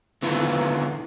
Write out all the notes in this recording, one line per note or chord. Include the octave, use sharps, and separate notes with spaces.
D3 D#3 B3 E4 F4 B4